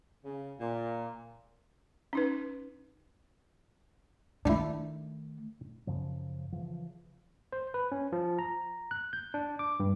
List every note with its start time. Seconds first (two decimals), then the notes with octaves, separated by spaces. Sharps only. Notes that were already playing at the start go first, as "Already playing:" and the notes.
0.25 C#3
0.59 A#2
2.13 C#4 D#4 B4
4.45 D#3 A3 D4 E4
5.87 F#2 C#3 F3
6.52 C#3 E3 F3
7.52 C5
7.74 B4
7.92 C#4
8.12 F3
8.39 A#5
8.91 F#6
9.13 G6
9.34 D4
9.59 D6
9.80 G2